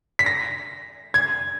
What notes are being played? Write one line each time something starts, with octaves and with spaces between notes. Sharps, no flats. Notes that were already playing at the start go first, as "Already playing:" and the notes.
B6
A#6
G#6